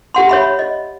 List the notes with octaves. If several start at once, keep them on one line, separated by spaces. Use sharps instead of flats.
G4 F#5 C6
C#5 E5 B5
D#5